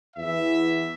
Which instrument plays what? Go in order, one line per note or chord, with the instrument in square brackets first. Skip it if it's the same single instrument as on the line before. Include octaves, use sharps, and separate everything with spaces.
[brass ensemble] E2 E3 E5